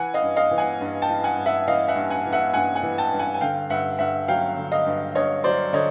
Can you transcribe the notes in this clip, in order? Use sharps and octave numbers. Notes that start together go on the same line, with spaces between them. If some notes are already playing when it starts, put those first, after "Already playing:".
Already playing: E3 F#5 G#5
D#5 F5
G2
D#5 F5
E3
F#5 G#5
G2
G5 A5
E3
F#5 G#5
G2
E5 F#5
E3 D#5 F5
E5 F#5
G2
F#5 G#5
E3
E5 F#5
G2 F#5 G#5
F#5 G#5
E3
G5 A5
G2
F#5 G#5
G#5
D3 F5 G5
G2 E5 F#5
G2 E5 F#5
F#3 F5 G5
D3
D#5 F5
G2
G2 C#5 D#5
F#3 C5 D5
D3 C#5 D#5